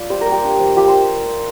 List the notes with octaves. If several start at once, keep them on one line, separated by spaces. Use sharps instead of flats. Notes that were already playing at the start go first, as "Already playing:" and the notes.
Already playing: F4 D5
G3 C5
A#4
A#3
G4
D4
F3
F4 G4
C5